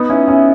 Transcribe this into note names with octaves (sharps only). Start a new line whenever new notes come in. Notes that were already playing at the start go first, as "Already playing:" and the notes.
Already playing: B3 D#4
C#4 E4
C#4 E4